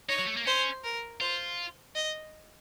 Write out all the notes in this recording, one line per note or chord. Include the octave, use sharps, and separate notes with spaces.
D#4 C#5
F#3
A3
A#3
C#4 C5
A#4
F4 C5
D#5